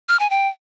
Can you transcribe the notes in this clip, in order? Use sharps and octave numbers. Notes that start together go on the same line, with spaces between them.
F6
G#5
G5